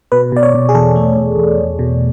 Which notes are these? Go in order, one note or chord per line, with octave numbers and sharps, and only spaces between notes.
B2 B4
B2 D5
C#5
B2
G#4
E2 A4
A3
E2
E2
E2
B2